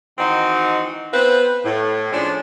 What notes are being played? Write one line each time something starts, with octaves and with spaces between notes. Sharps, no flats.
D#3 E3 G#3 C4 D#4 F#4
B3 C4 F4 B4
A2
F3 G#3 C#4 D4